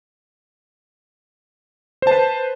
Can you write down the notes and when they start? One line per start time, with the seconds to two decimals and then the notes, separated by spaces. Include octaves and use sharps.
2.02 C5
2.07 A5
2.11 B4